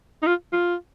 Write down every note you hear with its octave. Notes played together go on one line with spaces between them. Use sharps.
D#4
F4
F4